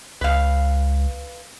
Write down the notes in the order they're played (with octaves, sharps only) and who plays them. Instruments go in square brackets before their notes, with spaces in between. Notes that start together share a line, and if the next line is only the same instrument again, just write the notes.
[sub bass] C#2 [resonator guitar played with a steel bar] B4 F5